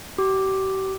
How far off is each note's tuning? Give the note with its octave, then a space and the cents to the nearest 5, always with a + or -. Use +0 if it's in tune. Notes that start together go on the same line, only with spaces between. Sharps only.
G4 -40 D6 +0